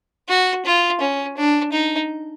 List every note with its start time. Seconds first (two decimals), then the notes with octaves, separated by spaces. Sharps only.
0.29 F#4
0.65 F4
1.01 C#4
1.37 D4
1.73 D#4